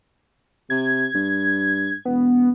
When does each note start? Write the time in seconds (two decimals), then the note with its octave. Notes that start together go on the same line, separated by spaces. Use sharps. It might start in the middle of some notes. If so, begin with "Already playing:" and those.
0.70 C3 G#6
1.15 G2
2.05 E1 B3